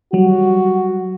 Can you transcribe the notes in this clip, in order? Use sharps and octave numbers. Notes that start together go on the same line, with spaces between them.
F#3 G3 F#4